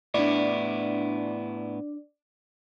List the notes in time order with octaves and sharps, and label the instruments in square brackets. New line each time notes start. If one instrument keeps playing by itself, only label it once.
[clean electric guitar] A2 B3 E4 [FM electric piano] D4 D5